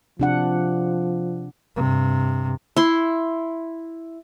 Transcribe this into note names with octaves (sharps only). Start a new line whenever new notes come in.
C3 F3 D4 F#5
G2 C3
E4 C6